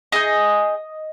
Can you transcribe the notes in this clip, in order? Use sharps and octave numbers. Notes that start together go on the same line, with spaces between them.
D#4 G#4 D#5